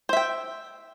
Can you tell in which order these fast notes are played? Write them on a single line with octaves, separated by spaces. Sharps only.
C5 E5 G5